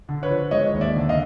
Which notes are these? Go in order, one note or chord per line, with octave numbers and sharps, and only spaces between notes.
D3
B4 C#5
F3
G#3 C#5 D#5
D#2
D5 E5
D3
D#5 F5